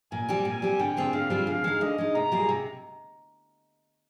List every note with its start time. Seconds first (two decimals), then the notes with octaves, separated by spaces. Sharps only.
0.12 A#2 G#5
0.29 G3 C4 G4
0.45 A#2 G#5
0.62 G3 C4 G4
0.79 D3 G5
0.97 G3 C4 F4 G#4
1.13 D3 F5
1.30 G3 C4 F4 G#4
1.47 D3 F5
1.64 G#3 D#4
1.81 D3 D#5
1.98 G#3 D#4
2.14 C3 A#5
2.32 G3 A#3 F4 G#4
2.49 C3